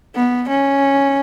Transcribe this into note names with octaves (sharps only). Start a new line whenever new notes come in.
B3
C#4